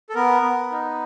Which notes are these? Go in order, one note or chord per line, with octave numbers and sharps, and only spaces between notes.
A4
B3 A#4
B3
D#4